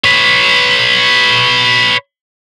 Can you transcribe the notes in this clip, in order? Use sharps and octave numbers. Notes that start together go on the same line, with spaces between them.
B4 C#5